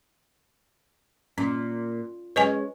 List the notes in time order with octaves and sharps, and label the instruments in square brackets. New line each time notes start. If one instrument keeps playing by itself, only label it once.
[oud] A#2 [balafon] C#4
[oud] G#3 C#4 [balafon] B4 D#5 G#5